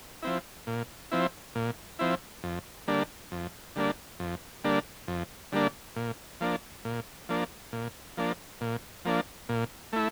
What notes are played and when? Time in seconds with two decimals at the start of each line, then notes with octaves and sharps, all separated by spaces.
0.22 F3 C4 E4
0.67 A#2
1.11 F3 C4 E4
1.55 A#2
1.99 F3 C4 E4
2.43 F2
2.88 D3 G3 A#3 D4
3.32 F2
3.76 D3 G3 A#3 D4
4.20 F2
4.64 D3 G3 A#3 D4
5.08 F2
5.52 D3 G3 A#3 D4
5.96 A#2
6.41 F3 A#3 D4
6.85 A#2
7.29 F3 A#3 D4
7.73 A#2
8.17 F3 A#3 D4
8.61 A#2
9.05 F3 A#3 D4
9.49 A#2
9.93 A3 E4